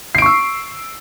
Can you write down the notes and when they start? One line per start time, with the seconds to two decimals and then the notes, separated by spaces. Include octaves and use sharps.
0.15 C7
0.18 D7
0.22 C#6
0.26 E6